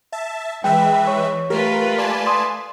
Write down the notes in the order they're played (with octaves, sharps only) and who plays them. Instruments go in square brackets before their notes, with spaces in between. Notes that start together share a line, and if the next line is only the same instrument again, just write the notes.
[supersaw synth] E5 A5
[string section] E3 [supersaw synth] G#3 B4 E5 [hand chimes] G5
[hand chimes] C#5 C#6
[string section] A3 F4 B4 [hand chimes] G4 [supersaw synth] A#4
[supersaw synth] D5 G#5 A5
[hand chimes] C6 D#6